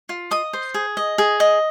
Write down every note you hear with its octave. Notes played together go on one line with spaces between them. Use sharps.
F4
D#5 D#6
C5
G#4
D#5
G#4
D#5